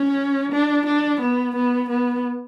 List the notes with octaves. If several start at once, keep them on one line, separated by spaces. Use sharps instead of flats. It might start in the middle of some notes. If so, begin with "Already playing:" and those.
Already playing: C#4
D4
D4
B3
B3
B3